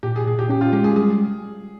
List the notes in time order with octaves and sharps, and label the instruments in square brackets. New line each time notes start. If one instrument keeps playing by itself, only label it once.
[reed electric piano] A#2 [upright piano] G4
[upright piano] G#4
[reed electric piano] A#2 [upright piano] G#4
[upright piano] G4
[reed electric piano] C#4 [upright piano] G4
[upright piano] F4
[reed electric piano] G#3 [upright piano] G4
[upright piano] G#4
[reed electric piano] G3 [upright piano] G#4